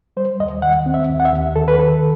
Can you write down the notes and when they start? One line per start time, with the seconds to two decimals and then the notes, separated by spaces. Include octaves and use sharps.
0.17 G3 C5
0.40 D#2 D#5
0.62 D#3 F#5
0.86 C4
0.94 E5
1.10 D#2
1.20 F#5
1.25 E5
1.32 D#2
1.56 D#3 A4
1.68 B4
1.78 D#3 A4